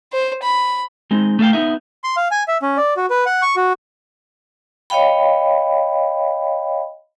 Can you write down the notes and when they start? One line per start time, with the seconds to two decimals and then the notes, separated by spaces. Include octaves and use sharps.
0.13 C5
0.43 B5
1.11 G#3 C4 D#4
1.39 A3 A4 D#5 F5 G5
1.53 B3 D#4 E5
2.04 C6
2.17 F5
2.31 G#5
2.48 E5
2.62 C#4
2.77 D5
2.97 F#4
3.10 B4
3.26 F#5
3.42 C#6
3.56 F#4
4.90 C#5 D#5 F5 G5 B5